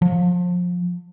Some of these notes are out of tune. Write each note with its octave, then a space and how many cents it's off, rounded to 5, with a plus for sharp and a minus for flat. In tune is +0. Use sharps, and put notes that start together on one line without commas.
F3 +25